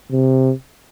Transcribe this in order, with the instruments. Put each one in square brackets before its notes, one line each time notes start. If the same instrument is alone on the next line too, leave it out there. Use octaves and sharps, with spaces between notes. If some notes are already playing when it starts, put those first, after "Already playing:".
[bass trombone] C3